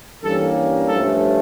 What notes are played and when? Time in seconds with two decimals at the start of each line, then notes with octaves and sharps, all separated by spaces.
0.23 G2 E3 G3 A#3 C#4 A4
0.88 G2 F3 A3 C#4 A4